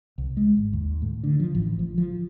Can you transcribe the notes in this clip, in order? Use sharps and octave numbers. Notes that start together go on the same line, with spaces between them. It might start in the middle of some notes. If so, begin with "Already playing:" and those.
C2
G#3
G#1
D#2
A2
D3
F3
A1
F3
F3